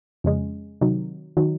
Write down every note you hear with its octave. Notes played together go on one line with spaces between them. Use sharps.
F2 C#3 G#3
C3 D#3 F#3
D#3 F#3